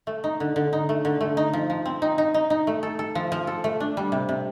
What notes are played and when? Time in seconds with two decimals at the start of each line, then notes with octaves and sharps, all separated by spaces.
0.07 A3
0.24 D#4
0.40 D3
0.56 D3
0.73 D#4
0.89 A3
1.05 D3
1.20 A3
1.37 D#4
1.53 F3
1.70 F3
1.85 C4
2.02 D#4
2.18 D#4
2.34 D#4
2.50 D#4
2.67 A3
2.83 A4
2.99 A4
3.15 F3
3.32 F3
3.47 A4
3.64 A3
3.80 D4
3.97 G3
4.12 C3
4.29 C3